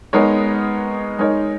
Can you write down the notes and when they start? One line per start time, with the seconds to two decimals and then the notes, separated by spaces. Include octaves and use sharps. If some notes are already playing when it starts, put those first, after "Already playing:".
0.13 G#3 B3 D#4 A#4 C#5
1.19 G#3 D#4 A#4 C#5